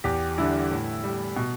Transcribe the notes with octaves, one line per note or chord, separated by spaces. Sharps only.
E2 G4
D3 G3 E4
A2
G3
B2